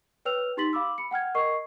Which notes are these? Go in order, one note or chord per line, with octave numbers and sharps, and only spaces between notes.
B4 C#5 G5 E6 F6 F7
D#4 G4 C6 A6 B6 F#7
F5 B5 D6 E6
B5 C#7
F#5 G5 F6 G#6
A#4 D#5 C#6 C7